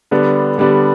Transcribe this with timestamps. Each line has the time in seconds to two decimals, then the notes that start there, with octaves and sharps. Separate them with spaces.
0.11 D3 G3 B3 D4
0.58 D3 G3 B3 D4